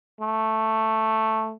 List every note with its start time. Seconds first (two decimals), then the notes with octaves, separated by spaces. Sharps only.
0.21 A3